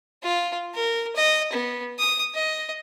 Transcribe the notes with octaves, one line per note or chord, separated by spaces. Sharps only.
F4
A#4
D#5
B3
D#6
D#5